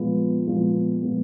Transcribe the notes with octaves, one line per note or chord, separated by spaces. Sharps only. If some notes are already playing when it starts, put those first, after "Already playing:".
Already playing: A#2 F3 G#3 B3
A#2 F3 G#3 B3
A#2 F3 G#3 B3